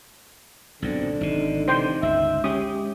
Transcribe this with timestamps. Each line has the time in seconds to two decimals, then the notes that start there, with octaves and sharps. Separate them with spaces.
0.82 B1 G#2 D3 C4
1.21 G#1 C3 D#4
1.68 C3 E3 C5 G5 C6
2.03 G1 C#2 E5
2.44 G#3 C#4 G4 D#6